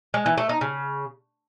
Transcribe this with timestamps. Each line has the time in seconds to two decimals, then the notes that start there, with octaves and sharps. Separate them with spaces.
0.14 G#3
0.26 E3
0.38 A3
0.49 D#4
0.61 C#3